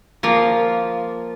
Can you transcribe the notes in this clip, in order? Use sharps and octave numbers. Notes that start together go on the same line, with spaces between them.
F3 A#3 F4